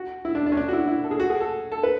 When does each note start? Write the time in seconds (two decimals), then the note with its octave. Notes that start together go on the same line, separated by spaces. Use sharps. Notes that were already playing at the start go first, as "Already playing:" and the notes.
Already playing: F#4
0.25 E4
0.35 D4
0.46 D4
0.52 C#4
0.57 D4
0.68 F#4
0.73 E4
0.88 E4
1.04 A4
1.11 G#4
1.20 F#4
1.30 G#4
1.40 A4
1.72 A4
1.83 B4